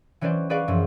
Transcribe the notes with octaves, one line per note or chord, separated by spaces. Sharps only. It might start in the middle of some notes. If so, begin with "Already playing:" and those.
E3 F#3 C#4 B4 C5 D5
G#4 B4 D5 F5 C#6
F#2 E3 F3